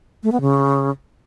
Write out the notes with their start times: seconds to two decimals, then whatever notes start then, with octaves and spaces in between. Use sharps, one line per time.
0.23 A3
0.32 B3
0.41 C#3